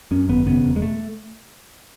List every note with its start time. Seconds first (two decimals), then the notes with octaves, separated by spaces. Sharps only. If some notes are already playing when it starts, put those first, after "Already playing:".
0.11 F#2 C#4
0.29 G#1 B3
0.47 C#3 B3
0.64 E1
0.76 G#3
0.82 A3